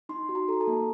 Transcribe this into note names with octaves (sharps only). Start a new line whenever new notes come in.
D#4 C6
F#4
A#5
A4 A#5
A5
A#3